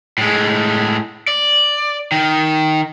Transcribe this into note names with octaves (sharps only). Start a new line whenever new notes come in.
A2 G#3
D5
D#3